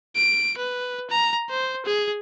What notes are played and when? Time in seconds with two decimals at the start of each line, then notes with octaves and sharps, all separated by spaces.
0.16 D7
0.58 B4
1.10 A#5
1.50 C5
1.86 G#4